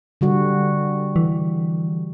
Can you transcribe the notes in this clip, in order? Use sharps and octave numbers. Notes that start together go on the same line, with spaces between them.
D3 G3 F#4
E3